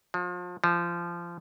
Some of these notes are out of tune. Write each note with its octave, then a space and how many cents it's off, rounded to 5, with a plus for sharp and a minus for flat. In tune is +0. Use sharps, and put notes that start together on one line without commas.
F3 +35
F3 -20